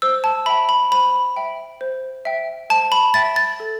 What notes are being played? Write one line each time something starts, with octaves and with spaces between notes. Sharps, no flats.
C5 E6
A5
E5 G5 B5
B5
C5 B5
E5 G5
C5
E5 G5
C5 A5
B5
E5 G5 A6
A6
A4